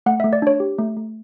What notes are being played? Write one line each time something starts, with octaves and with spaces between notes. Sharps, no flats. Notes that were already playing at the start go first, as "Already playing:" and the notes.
A3 F#5
A3 E5
D5
D4 C#5
G4
A3
A3